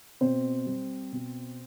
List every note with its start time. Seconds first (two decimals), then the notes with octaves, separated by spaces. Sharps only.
0.21 B2 C4 C5
0.66 G3
1.12 B2